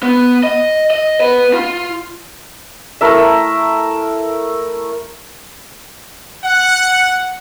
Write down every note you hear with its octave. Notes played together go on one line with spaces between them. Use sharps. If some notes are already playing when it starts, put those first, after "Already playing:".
B3
D#5
D#5
B3 B4
F4
A3 E4 A#4 E5
F#5